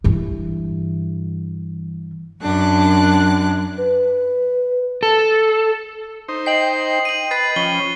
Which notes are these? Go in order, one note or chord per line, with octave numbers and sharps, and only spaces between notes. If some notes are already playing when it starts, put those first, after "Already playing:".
G2 E3
F#2 D4 F#6
B4
A4
D#4 C5
D#5 G5 C7 F#7
D#7 F#7
B4 A6 C7 D#7
F3 C#4 B5 G7